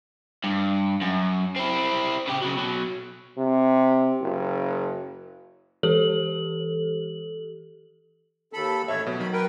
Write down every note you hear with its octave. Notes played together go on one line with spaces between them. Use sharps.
G2
F#2
C4 E4
C#3 G4
C#3 F#3
B2 F#3
C3
F#1
E3 G4 A4 F#7
D#2 A4 B5
A1 A4 C#5 E5
B2 F#3
D#3 F#3 B5
A#4 B4 G5